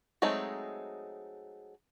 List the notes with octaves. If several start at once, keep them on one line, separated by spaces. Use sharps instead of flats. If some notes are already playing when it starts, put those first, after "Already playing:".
F#3 G#3 A3 C4 D#4